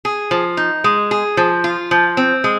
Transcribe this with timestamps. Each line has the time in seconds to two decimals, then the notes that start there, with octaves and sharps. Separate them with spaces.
0.05 G#4
0.31 F3
0.57 D#4
0.84 G#3
1.11 G#4
1.37 F3
1.64 F4
1.91 F3
2.17 C4
2.44 G#3